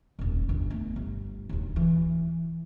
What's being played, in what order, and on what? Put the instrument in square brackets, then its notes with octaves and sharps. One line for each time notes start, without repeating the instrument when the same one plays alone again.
[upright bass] D#1 G#1
G1
A3 B3
G1
D1 D#2
E3